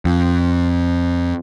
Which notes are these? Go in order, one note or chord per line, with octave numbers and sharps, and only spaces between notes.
F2